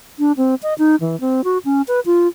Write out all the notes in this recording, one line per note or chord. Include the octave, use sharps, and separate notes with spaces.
D4
C4
D#5
D#4
E3
C4
F#4
C#4
B4
F4